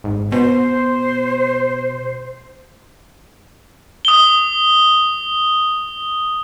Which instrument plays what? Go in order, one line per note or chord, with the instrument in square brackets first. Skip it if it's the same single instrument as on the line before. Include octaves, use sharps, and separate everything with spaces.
[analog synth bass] G#1
[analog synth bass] B2 [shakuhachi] C5
[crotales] D#6 G7